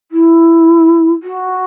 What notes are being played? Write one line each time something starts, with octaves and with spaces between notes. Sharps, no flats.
E4
F#4